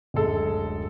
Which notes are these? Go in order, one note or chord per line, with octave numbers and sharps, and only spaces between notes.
D1 F#2 G#3 A4